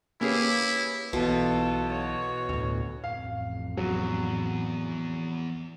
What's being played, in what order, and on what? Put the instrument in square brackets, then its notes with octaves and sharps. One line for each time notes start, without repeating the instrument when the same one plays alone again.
[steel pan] A#3 [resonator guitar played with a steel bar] C#4 G4 G#4 [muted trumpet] E4 [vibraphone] B4 C#5
[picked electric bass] B1 E3 [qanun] B2 [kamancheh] F4 A4
[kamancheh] F#4 C#5
[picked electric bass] D2 A2
[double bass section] A1 F2 [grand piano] F5
[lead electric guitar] E2 [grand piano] F#3